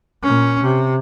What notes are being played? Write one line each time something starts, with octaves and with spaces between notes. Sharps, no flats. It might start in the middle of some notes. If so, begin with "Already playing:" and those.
A#2 C#4
C3